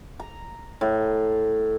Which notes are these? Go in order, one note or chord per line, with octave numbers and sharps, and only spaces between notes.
A#5
A2